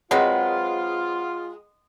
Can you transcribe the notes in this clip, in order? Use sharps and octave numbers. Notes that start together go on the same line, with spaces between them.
F#3 G#3 C4 F4 B4 F#5